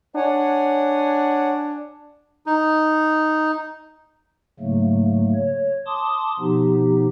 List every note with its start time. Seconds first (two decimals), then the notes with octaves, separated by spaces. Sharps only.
0.16 D4 C#5 F#5 G#5
2.46 D#4
4.60 G#2 C#3 F#3 A3 A#3
5.34 C#5
5.86 A5 C6 D6 D#6
6.40 B2 F3 B3 D#4 G4